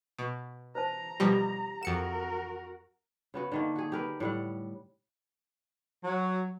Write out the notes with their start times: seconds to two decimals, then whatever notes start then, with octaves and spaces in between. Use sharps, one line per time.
0.19 B2
0.75 B4 C5 A5 A#5
1.20 B2 F3 G3 G4
1.83 F2 F#4 A#4 C#7 E7
3.34 C#3 B3 F#4
3.52 D3 D#3 A#3
3.76 F#4 G#4
3.92 G4 A#4 B4
4.20 A2 G3 F#5
6.04 F#3